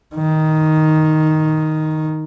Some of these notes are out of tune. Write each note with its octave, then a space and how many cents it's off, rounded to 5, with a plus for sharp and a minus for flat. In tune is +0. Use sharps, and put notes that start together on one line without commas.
D#3 +5